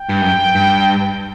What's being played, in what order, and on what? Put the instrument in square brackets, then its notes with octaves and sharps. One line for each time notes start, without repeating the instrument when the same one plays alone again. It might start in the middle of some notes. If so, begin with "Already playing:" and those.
Already playing: [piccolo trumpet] G5
[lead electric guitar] G2
F#2
G2